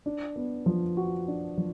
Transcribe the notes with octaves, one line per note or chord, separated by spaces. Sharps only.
D4
B3
F3
F#4
D4
F3